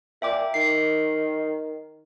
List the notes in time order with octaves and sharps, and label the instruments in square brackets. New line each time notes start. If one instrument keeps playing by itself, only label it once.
[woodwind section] A#2 [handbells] E5 G5 D6
[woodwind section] D#3 [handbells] C7